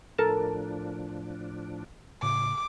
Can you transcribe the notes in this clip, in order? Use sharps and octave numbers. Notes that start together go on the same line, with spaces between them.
A2 F3 D4 A4 A#4 A5
A2 C#3 D6